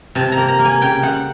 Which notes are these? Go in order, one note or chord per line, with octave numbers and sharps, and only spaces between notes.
C3 A5
A#5
A#3
A#5
A#3
G#5
C#3 G5
C#3 F#5